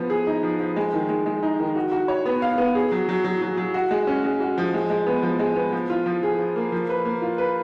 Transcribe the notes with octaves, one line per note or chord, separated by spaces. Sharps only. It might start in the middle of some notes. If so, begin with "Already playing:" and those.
Already playing: F3 B3
G#4
D#4
F3
F3
G#3
D#3
G#3
G#3
D#4
D#3
F#4
F#4
C#5
B3
F5
B3
G#4
F#3
F#3
F#3
F#3
F#3
F#4
G#3
C#4
G#3
F#4
F3
G#3
G#3
B3
F3
G#3
B3
F3
F4
F3
G#4
F3
A#3
F3
B4
A#3
F4
B4